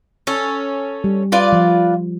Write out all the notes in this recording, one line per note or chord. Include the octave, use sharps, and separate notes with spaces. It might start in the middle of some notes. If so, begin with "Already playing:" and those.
C#4 A4
G3
F4 B4 D5
F3